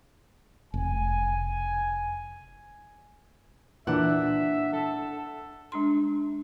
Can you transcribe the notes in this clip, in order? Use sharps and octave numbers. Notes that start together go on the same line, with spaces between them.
F1 G#5
A#2 E3 D4 E5 F#5
A4
G#3 D4 C6